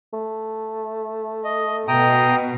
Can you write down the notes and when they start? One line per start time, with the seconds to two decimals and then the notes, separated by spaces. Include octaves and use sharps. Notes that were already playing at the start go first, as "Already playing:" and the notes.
0.13 A3
1.44 D#5
1.88 B2 G5 A#5 D#6